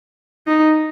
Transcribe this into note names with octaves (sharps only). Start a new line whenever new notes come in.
D#4